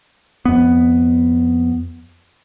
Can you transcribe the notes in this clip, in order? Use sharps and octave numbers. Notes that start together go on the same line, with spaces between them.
F2 B3